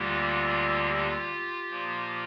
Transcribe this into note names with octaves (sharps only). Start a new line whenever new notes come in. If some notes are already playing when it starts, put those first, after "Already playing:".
Already playing: D2 D3 G3 A#3 F4 G4
F4 G4
A#2 F3 A#3